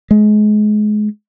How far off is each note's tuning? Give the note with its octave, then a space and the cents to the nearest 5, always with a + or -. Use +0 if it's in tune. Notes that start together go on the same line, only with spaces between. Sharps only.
G#3 +30